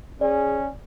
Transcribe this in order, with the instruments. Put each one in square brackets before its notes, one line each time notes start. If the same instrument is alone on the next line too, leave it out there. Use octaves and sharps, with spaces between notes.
[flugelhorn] C#4 [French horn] G#4 [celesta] D5